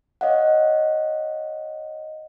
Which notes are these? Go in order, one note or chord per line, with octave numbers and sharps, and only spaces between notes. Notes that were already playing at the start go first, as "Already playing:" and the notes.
C#5 D#5 F5 F#5